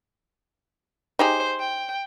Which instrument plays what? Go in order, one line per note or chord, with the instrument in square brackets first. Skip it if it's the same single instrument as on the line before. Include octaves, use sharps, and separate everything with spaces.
[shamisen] D#4 G4 G#4 [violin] C5
[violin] G5